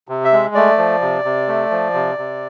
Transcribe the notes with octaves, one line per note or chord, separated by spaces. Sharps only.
C3
E5
G#3
A3 D5
F3
C3
C3
A3
F3
C3
C3